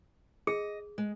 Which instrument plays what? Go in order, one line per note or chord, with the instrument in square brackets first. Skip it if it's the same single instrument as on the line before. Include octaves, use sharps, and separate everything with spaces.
[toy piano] G#4 [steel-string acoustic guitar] D#5
[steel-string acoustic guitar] G#3